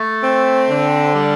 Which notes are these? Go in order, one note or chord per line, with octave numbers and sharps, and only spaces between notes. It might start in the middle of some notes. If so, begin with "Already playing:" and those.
Already playing: A3
C4
D3
G3